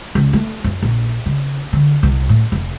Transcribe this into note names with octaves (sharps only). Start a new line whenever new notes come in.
C#2
A3
F#2
A#1
C#3
D3
C2
A2
F1